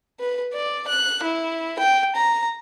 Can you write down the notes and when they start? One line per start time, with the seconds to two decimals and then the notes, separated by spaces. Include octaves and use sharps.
0.20 B4
0.54 D5
0.88 F#6
1.23 E4
1.79 G5
2.15 A#5